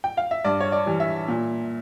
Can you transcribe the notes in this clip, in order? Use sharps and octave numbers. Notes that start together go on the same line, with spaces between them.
G5
F5
E5
G2 D5
C#5
D5
E3 G3
E5
A#2